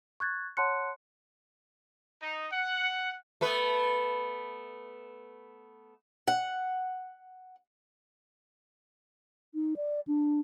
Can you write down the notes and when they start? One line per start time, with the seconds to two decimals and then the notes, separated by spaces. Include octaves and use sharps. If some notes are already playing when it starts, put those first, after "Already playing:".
0.20 C#6 F#6 G#6 A6
0.57 C#5 F#5 A5 C6 F#6 C#7
2.22 D#4
2.52 F#5
3.41 A3 B3 B4
6.27 F#5
9.55 D#4
9.76 D5
10.07 D4